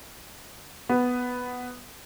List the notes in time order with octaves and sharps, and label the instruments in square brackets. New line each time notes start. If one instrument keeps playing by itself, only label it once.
[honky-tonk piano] B3